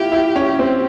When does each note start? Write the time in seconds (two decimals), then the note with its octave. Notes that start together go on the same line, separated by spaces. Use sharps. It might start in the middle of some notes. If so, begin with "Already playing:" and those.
Already playing: E4 F4 G4
0.12 E4
0.36 C#4
0.59 C4